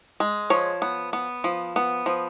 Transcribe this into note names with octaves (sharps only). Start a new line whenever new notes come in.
G#3
F3 C#5
B3
B3
F3
B3
F3